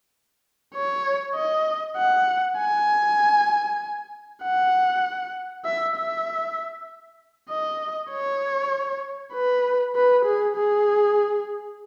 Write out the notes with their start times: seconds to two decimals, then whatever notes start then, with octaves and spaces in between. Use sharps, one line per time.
0.75 C#5
1.36 D#5
1.98 F#5
2.58 G#5
4.43 F#5
5.65 E5
5.96 E5
7.50 D#5
8.10 C#5
9.33 B4
9.95 B4
10.25 G#4
10.56 G#4